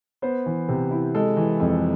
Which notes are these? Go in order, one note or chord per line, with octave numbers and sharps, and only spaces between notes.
B3 C5
E3
C3
E4
G#3 A4
E3
F2